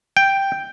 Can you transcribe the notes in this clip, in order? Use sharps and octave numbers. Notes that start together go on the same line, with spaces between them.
G5